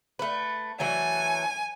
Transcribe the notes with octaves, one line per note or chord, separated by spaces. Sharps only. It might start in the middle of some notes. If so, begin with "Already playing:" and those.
A3 B4
E3 F#3 A3 G#5